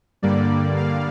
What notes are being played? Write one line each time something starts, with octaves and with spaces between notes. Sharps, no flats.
G2 D3 G3 A#3 D5
F5